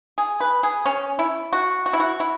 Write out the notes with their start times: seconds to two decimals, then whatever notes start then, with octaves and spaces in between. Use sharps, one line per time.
0.18 G#4
0.40 B4
0.63 G#4
0.85 C#4
1.19 E4
1.53 F#4
1.86 F#4
1.93 E4
2.00 F#4
2.20 E4